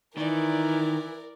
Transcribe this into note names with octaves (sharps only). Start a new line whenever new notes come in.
D#3 E3 A#4 D5